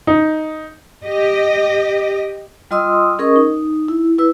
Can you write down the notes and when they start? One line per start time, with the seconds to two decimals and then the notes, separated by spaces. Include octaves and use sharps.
0.07 D#4
1.02 G4 D#5
2.71 G3 F4 D#5 C6 D#6 E6
3.19 C#4 G#4 A#4 D#5 C#6 D#6
3.36 D#4
3.88 E4
4.19 E4 B4 E6